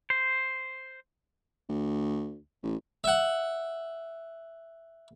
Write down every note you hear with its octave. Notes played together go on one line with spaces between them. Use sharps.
C5
D2
A1
E5 F#5